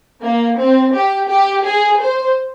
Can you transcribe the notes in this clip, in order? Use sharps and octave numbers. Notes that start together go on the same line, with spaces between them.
A#3
C4
G4
G4
G#4
C5